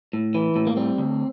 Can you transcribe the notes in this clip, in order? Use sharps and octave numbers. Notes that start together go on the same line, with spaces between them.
A2
E3
A2
A#3
G3 C4
D2